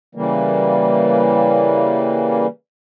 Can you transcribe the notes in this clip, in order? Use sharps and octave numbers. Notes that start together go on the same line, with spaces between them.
C#3 E3 G3 A#3